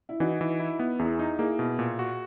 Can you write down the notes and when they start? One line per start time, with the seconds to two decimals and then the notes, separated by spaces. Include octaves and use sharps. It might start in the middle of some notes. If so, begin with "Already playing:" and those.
0.09 E4
0.20 E3 D#4 F#4
0.41 E3
0.60 E4
0.79 B3
0.99 E2 E4 G#4
1.19 D#4
1.39 A#3 E4 G#4
1.59 B2
1.79 A#2
1.99 F#4